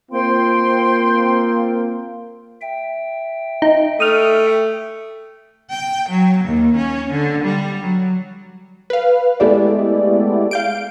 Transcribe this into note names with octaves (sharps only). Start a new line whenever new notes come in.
A#3 C4 F4 C5 G5 C6
E5 G5
D#4
A3 D#6 F6
G5
F#3
D#2
C#4
D3
G3
F#3
B4 F5
G#3 A3 B3 E4 G4 D5
F5 G6 D7